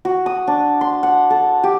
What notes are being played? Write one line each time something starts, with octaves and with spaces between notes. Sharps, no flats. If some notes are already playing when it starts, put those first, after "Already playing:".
F#4
D#6
D4
C6
F#5
A4
G4